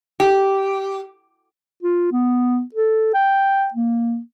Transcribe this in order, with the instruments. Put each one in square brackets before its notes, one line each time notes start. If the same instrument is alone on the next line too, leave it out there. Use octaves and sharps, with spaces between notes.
[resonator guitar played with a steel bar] G4
[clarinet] F4
B3
A4
G5
A#3